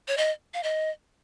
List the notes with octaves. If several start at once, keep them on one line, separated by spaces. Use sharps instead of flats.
C#5
D#5
F5
D#5